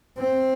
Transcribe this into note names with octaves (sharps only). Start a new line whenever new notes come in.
C4